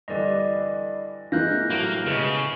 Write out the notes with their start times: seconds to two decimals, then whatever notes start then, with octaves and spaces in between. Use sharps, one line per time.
0.08 G2 D3 E3 D5 D#5
1.32 E3 G#3 A#3 F4 F#6 G6 A#6
1.70 A2 F#3 A#3
2.06 C#3 G#3 B3